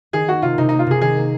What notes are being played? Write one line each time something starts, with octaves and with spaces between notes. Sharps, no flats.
D#3 G#4
A#3 F#4
C3 F4
C3 D#4
A#3 D#4
F4
C3 G#4
D#3 G#4
A#3